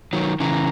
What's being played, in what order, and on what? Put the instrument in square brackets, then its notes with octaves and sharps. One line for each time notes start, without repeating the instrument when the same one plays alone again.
[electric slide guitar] D#3 F#3
[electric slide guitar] C#3 E3 [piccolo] A#5